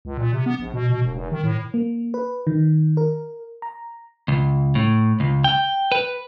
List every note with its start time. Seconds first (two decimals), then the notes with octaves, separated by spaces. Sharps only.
0.05 C#2
0.18 A#2
0.33 C3
0.46 B3
0.59 A#1
0.74 B2
0.89 B2
1.02 E1
1.13 F1
1.32 D#3
1.43 A2
1.74 A#3
2.14 B4
2.47 D#3
2.97 A#4
3.62 A#5
4.28 C#2
4.75 A2
5.20 C#2
5.44 G5
5.92 B4